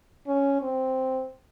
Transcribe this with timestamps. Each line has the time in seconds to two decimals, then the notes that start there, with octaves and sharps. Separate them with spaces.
0.27 C#4
0.62 C4